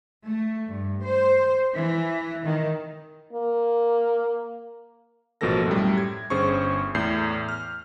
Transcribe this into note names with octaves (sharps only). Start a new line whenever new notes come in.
A3
G2
C5
E3
D#3
A#3
A1 B2 F3 A#3 A4 A#6
F#2 A2 G3
G#6
G1 C#4 G#4 C5 C#6
E2 A2 G6 C7
F6